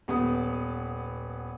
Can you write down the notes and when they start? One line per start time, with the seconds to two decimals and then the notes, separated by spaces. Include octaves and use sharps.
0.08 D#1 B3 D#6